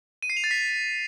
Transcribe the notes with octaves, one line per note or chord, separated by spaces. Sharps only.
D#7
C7
F7
A6
B6